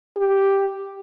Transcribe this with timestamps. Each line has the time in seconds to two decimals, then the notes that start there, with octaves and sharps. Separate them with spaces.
0.17 G4